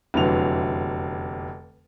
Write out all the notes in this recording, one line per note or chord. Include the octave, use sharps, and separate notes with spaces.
F1 E2 D3 E3 F#3 F7